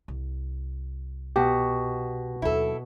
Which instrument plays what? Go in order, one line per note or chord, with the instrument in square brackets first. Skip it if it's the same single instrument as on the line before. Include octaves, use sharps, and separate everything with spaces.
[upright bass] C2
[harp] B2 [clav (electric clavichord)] G4
[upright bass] D#2 F#3 [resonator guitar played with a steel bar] E4 A4